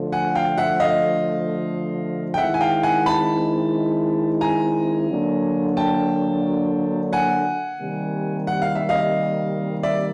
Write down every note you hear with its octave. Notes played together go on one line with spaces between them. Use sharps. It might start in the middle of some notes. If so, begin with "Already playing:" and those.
Already playing: D3 F3 A3
F#5 G#5
F5 G5
E5 F#5
D#5 F5
G5
D#3 G#3 C4 E4 E5 F#5
G#5
F5 G5
F#5 G#5
A5 B5
G#5 A#5
D3 F#3 A#3 D4
G5 A5
F#5 G#5
C3 D#3 G3 A#3
F#5
F5
E5
D#5 F5
D5 E5